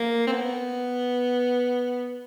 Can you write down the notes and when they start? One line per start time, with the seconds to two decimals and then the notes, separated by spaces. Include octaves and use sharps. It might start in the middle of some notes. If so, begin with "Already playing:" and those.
Already playing: A#3
0.27 C4
0.32 B3